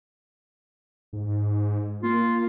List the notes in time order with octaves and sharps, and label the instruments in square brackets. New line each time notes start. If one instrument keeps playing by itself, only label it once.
[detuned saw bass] G#2
[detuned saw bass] A#3 [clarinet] F4